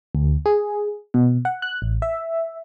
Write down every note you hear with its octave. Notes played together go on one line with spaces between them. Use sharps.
D2
G#4
B2
F#5
F#6
A1
E5